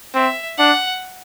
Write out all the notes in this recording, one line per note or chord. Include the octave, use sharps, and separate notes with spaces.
C4 E5
D4 F#5